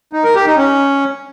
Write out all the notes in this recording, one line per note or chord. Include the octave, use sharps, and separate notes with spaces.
D#4
A#4
G4
D#4
C#4